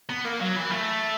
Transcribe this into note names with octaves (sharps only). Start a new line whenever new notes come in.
B3
A#3
F#3
E3
A3